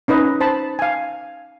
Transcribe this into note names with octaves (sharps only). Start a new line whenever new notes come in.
C#4 D#4 B4 D#5
C5 A5 B5
F5 G#5